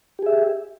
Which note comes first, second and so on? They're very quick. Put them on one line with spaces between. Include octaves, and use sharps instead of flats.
G4 G#4 E5